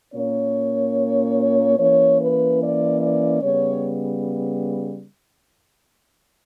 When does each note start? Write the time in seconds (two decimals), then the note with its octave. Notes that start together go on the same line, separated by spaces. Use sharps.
0.14 A#2 A#3 C#4 C#5
1.78 E3 A#3 C#4 C#5
2.20 B4
2.61 D5
3.02 D5
3.43 C#3 G3 B3 C#5